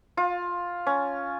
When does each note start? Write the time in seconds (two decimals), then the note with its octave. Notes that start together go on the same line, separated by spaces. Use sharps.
0.17 F4
0.87 C#4